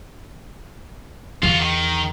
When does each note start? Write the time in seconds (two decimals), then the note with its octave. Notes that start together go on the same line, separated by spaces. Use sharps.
1.43 E2 F4 F#4
1.61 D#3